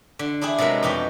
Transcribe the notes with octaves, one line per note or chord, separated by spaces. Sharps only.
D3
D4 E4 G4 G#4
C3 F#3 G#3 A#4 B4
F2 B2 D#4 G4